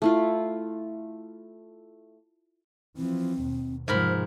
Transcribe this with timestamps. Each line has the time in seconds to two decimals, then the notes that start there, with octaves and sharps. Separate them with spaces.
0.02 A3 E4 F4
2.97 E3 F3 C4
3.41 D#2 B2
3.88 G#2 C3 F3 A#4 C5 B5